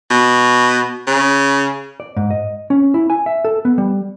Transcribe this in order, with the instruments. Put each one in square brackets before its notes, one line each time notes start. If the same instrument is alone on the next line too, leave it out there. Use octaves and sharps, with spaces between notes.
[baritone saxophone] B2
C#3
[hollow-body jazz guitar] D5
G#2
D#5
C#4
E4
G#5
E5
A4
B3
G3